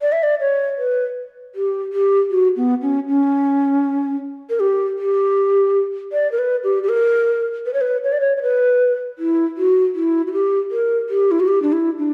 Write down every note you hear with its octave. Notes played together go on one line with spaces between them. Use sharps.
D5
E5
D5
C#5
B4
G4
G4
F#4
B3
C#4
C#4
A#4
G4
G4
D5
A#4
B4
G4
G4
A#4
B4
C#5
B4
C#5
D5
C#5
C#5
B4
E4
F#4
E4
F#4
G4
A#4
G4
E4
F#4
G4
D4
E4
D4